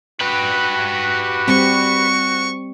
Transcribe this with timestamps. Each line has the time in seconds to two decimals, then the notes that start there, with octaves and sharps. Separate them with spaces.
0.21 F#4 G4 B4
1.48 G3 C4 C#6